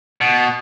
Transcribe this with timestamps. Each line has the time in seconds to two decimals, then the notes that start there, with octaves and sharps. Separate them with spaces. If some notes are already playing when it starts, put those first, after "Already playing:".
0.21 B2